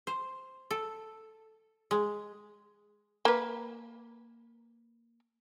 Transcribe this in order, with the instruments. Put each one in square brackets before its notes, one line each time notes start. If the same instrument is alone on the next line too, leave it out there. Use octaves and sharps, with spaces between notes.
[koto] C5
A4
G#3
[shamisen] A#3 B4